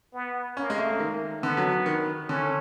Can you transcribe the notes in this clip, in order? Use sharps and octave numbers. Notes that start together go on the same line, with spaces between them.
B3
A#3 C#4
G#3
A3
D#3
D3 B3
F#3
D#3
D3 C#4